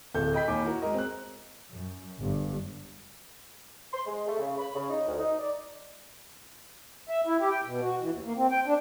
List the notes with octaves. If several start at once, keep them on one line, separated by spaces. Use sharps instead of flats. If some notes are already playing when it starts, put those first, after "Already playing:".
D1 A4 G6
D#5 G5 B5 G6 B6
D#2 D#3 G#5 D6
E4 F#4 A#4
G#3 A#4 D#5
C4 F#6
F#2
G1 G2
C6
G#3
A3
C#3
B5
C#3
D#4
D2
D#4
D5
E5
E4
G4
G5
B2
F#4
E3
D#2
A#3
C4
G5
D4